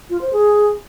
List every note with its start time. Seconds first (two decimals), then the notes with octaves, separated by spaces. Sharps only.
0.10 F4
0.21 C5
0.33 G#4